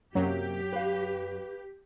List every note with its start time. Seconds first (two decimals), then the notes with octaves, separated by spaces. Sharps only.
0.15 F#2 C3 F#3 A#3 G4
0.72 B4 F5